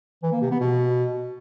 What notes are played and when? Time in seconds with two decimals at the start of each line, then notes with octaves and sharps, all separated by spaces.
0.23 E3
0.32 A#3
0.42 C3
0.51 B3
0.61 B2